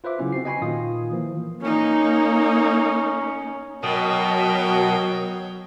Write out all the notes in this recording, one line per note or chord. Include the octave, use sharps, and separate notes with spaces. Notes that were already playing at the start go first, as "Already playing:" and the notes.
F4 B4 C5 E5 D6
C#3 F#3 B3 C#4 E4
C4 F#4 C7
D#5 G5 G#5 B5 C#6 C7
A#2 D#3 F4 D#6
E3 F3 A#3
A#3 C#4 D#4
B2 F#3 A#4 C#5 D#5 G5